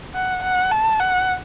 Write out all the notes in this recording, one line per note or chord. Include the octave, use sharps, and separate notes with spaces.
F#5
F#5
A5
F#5